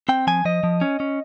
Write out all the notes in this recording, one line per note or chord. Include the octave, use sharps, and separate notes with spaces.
C4 G5
F3 G#5
F3 D#5
F3
C#4
C#4